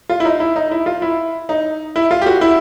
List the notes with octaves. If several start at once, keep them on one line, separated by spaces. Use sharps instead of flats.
F4
E4
D#4
E4
D#4
E4
F4
E4
D#4
E4
F4
G4
F#4
E4